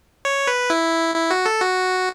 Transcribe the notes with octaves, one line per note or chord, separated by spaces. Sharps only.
C#5
B4
E4
E4
F#4
A4
F#4